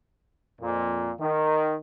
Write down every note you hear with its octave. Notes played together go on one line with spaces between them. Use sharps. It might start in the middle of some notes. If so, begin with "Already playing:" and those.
F2 A#2
D#3